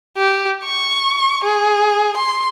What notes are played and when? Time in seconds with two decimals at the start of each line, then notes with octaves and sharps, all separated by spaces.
0.17 G4
0.64 C#6
1.44 G#4
2.16 C6